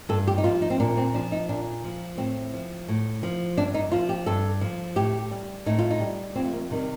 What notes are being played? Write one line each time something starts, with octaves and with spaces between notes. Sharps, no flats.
G2 A4
G4
D#4
F3 F4
D#4
C4
A#2 D4
C4
F3 D4
D#4
A#2 D4
F3
A2 C4
F3
A2
F3
G2 D4
D#4
F3 F4
G4
G2 A4
F3
A2 G4
G3
A2 D#4
F4
D#4
G3
F2 C4
A3
A#3
C3 D#3 G3